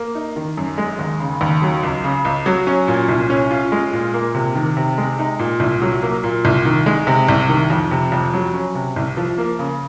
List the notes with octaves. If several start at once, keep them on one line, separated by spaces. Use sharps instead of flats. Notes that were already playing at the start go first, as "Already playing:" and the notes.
Already playing: A#3
D#4
D#3
F#2
G#3
D#2
C#3
D#2
F#3
C#2
C#3
C#2
F#3
C#4
A#2
C2
C#4
F4
G#3
A#2
A#3
C3
D#3
C3
G#3
D#4
A#2
C2
F#3
A#3
A#2
C2
D#3
G#3
C3
C2
D#3
F2
C3
F2
F#3
C#4
C3
C2
F3
A#3
C#3